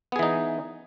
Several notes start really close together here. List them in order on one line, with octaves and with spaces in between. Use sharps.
B3 G#4 E3 D#4